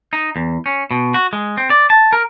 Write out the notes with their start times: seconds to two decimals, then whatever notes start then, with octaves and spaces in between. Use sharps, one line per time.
0.13 D#4
0.36 E2
0.66 C#4
0.91 B2
1.14 F#4
1.33 G#3
1.57 C4
1.70 D5
1.90 A5
2.13 A#4